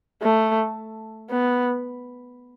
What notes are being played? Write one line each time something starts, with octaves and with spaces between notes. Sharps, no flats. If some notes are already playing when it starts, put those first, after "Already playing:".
A3
B3